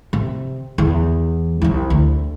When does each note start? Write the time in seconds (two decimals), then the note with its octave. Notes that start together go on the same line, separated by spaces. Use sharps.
0.13 C3
0.78 E2 E3
1.62 C2 E4
1.90 D2